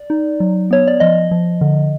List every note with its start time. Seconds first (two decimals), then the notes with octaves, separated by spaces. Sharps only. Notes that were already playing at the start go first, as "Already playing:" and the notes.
Already playing: D5
0.10 D#4
0.40 F#3
0.71 B3 C#5
0.87 D5
1.00 F3 D#5
1.31 F3
1.61 D3